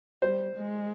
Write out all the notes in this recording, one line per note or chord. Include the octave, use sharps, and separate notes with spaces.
G3 C5
G#3